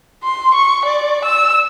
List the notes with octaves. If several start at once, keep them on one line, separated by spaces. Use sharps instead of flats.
C6
C#6
D5
E6